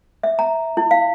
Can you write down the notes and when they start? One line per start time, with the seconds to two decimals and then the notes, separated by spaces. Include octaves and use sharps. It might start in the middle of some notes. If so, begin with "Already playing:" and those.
0.23 E5
0.39 A#5
0.77 E4
0.91 F5